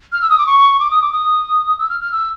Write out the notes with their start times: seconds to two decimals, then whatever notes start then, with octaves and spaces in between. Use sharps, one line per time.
0.12 F6
0.21 E6
0.30 D#6
0.38 D6
0.46 C#6
0.80 D6
0.91 D#6
1.02 D6
1.12 D#6
1.79 E6
1.89 F6
2.00 F6
2.12 E6